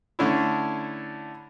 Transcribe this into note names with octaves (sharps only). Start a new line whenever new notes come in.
D3 A3 C#4 D4 E4